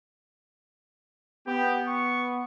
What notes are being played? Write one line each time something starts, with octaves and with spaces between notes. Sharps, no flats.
B3 G4
C#6